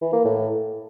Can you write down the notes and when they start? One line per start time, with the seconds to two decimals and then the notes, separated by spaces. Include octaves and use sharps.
0.01 E3
0.13 A#3
0.25 A2